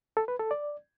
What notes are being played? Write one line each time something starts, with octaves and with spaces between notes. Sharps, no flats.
A4
B4
A4
D5